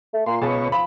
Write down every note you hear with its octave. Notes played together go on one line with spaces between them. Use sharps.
A3
A#2 C6
C#2 B2 G#4 C#5 A5
F3 B5